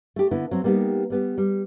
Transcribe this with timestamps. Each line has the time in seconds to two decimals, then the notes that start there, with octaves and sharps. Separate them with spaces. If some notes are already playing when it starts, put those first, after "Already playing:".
0.16 A3 G4
0.31 D3 B3 E4
0.51 F#3 C4
0.64 G3 A#3 B3 D#4 G4
1.10 G3 B3 G4
1.38 G3